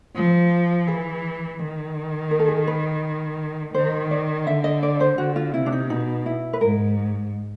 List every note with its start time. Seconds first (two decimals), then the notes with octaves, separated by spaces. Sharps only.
0.15 F3
0.87 E3 G#4
1.59 D#3
2.31 A#4
2.39 A4
2.48 G#4
2.56 A4
2.67 B4
3.74 D#3 C5
4.11 D5
4.46 D3 E5
4.64 D#5
4.83 D5
5.00 C5
5.18 D3 F#4
5.36 F4
5.54 C3 E4
5.66 D4
5.72 D#4
5.89 B2 D#4
6.26 E4
6.53 B4
6.61 G#2 A#4